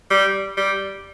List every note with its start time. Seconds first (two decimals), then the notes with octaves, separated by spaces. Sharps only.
0.10 G3
0.57 G3